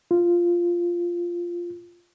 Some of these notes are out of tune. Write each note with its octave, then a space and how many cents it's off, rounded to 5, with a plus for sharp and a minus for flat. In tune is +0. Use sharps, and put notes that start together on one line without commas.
F4 -5